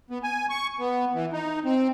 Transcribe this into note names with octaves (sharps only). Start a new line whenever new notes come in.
B3
G#5
C#6
B3
E3
D#4
C4